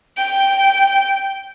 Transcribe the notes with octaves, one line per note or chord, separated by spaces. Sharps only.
G5